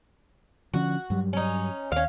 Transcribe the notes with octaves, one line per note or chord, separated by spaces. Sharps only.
D3 F3 C#4 F#4
G2 F#3 G3
C#4 D#4
D#2 C#4 F5